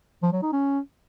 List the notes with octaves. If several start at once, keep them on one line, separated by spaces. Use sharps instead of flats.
F3
F#3
D#4
C#4